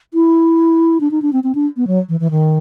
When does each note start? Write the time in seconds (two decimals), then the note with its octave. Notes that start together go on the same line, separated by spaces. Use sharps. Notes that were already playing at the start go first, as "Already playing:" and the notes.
0.14 E4
1.00 D4
1.11 D#4
1.22 D4
1.33 C4
1.44 C4
1.55 D4
1.77 B3
1.87 F#3
2.09 E3
2.20 E3
2.31 D#3